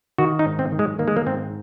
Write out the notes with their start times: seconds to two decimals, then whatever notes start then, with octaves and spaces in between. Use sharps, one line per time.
0.18 D#3 F#4
0.39 D#4
0.45 G#2
0.59 C4
0.72 D#3
0.79 G#3
0.99 D#3 A#3
1.08 G#3
1.17 A#3
1.26 G#2 C4